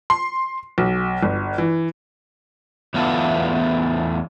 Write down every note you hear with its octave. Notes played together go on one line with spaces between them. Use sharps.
C6
B1
G1
E3
E2 A3 B3 F4 A4